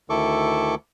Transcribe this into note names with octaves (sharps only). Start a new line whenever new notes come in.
D2 D#3 E4 A4 C#6 D6